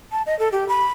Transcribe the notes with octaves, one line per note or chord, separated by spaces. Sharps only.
A5
D#5
A4
G4
B5